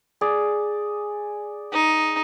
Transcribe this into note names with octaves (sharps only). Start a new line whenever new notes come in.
G#4 D5
D#4